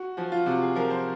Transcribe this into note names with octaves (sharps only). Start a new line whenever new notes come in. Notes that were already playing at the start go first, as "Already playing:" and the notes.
Already playing: F#4
F3 F#4
F4
C3 F#4
G#4
F3 A#4
C5